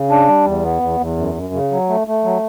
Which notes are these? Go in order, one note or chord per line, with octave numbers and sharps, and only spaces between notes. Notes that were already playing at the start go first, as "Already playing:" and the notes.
Already playing: C#3
D4
G3
E2
B3
E2
E2
F#2
F#2
C#3
F#3
A3
A3
F#3